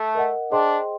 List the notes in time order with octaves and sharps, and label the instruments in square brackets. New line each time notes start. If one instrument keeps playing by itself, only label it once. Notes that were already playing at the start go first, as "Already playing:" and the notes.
Already playing: [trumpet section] A3
[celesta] A#4 D#5 F#5
[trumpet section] D4 [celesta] G#4 C5 D#5 G5 C6